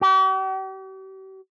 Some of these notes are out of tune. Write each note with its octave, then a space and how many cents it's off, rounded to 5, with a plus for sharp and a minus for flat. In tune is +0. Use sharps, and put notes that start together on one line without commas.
G4 -45